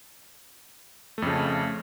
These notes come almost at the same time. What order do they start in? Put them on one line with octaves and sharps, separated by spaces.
A3 F2 C#3